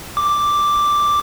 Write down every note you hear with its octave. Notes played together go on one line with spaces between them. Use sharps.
D6